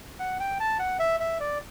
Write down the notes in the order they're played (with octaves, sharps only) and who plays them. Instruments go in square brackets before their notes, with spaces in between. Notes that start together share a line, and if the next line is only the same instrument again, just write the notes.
[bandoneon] F#5
G5
A5
F#5
E5
E5
D5